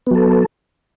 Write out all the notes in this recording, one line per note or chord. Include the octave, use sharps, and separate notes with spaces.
F#3 B3 A4